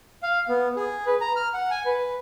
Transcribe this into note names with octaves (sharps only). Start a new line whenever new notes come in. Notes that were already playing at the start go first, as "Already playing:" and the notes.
F5
B3
G#4
B4
A#5
F6
F#5
G#5
B4